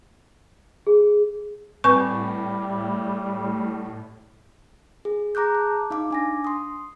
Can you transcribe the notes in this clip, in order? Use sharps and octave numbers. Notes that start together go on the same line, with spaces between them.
G#4
A2 G3 C4 B4 C#6
G#4
G#4 A#5 D6 F#6 G6
A5
D#4 F5 D6
D4 G#5 A#6
C6 D#6